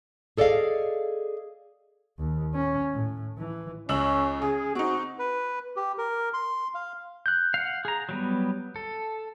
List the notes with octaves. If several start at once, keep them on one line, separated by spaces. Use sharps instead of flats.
G#4 A4 D5 D#5 F5
D#2
C#4
A2
E3
C#2 C#4 E6 F#7
C#3 G#4
C4 D#4 F#4
B4
G4
A#4
C6
F5
F#6 G6
F5 F#5
G#4 A#5
F#3 G3 B3
A4